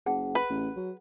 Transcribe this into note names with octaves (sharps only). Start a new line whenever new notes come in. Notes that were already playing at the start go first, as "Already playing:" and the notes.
F#1 G#4 F#5 A5
B4
A1
F#3